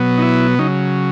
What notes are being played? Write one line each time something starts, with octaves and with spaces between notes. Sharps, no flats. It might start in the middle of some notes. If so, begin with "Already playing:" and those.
Already playing: B2 F#3 B3
D#4
E4
C#3 F#3 D#4